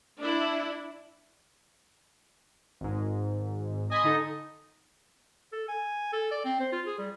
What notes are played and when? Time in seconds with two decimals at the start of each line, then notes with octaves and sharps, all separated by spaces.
0.19 D4 E4
2.81 G#1 G#2
3.91 D#5 G#5 B5 C6
4.04 D3 D#4 A4
5.53 A4
5.68 G#5
6.13 A4
6.31 D5
6.45 C4
6.60 C5
6.72 F4
6.86 G#4
6.99 G3